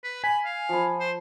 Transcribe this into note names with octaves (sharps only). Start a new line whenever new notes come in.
B4
G#5 B5
F5
F3 B5
C5